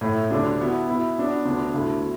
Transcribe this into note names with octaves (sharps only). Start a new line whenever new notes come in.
A2 A3 E4
D2 D3 G3 D4
B2 B3 E4
B2 B3 E4
B2 B3 D4
D2 D3 B3 D4
D2 D3 A3 E4
B2